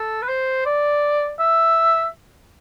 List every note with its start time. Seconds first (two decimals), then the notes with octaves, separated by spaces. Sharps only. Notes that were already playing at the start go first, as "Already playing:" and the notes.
Already playing: A4
0.22 B4
0.29 C5
0.66 D5
1.39 E5